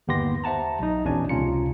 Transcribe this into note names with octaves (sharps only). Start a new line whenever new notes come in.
G1 D#2 B3 G4 C6 A#6
C5 E5 F#5 A5 A#5
B1 D#4
A#1 E2 B2 C#4 D4 G#5
C#2 C3 C#4 F4 A#5 C#7